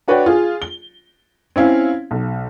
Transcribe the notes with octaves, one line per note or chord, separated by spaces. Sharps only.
D4 F#4 B4 C#5 D5 G5
F4 G#4
G7
C4 C#4 E4 F5
B1